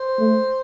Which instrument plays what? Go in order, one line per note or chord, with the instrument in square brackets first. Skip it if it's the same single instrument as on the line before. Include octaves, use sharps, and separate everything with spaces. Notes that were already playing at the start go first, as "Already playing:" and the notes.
Already playing: [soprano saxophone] C5
[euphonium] A3